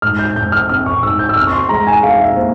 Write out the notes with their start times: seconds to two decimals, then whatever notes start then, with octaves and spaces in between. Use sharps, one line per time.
0.02 G#2 F6
0.19 G6
0.36 G#2 G6
0.52 F6
0.69 C4 F6
0.86 C#6
1.03 G#2 E6
1.19 G6
1.29 E6
1.37 C4 F6
1.47 C#6
1.53 C6
1.69 G#3 A#5
1.87 G#5
2.03 G#3 F5
2.20 E5
2.37 A#2 C5